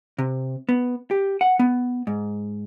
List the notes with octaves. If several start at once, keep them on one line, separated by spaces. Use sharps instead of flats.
C3
B3
G4
F#5
B3
G#2